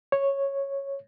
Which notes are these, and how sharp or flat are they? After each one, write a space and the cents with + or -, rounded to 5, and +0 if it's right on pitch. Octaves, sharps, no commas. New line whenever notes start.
C#5 -5